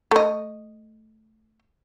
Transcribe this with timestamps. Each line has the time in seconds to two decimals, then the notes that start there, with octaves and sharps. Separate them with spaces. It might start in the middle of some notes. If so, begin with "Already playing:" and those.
0.11 A3 D#5